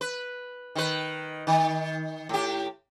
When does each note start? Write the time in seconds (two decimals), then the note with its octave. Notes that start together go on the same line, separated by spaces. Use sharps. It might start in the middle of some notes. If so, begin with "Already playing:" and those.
0.01 B4
0.75 D#3 B4
1.47 D#3
2.29 A2 G4